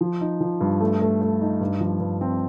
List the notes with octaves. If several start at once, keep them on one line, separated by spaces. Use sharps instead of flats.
F3
D#4
F3
G2
A3
A3
A3
D#4
G2
F3
G2
C4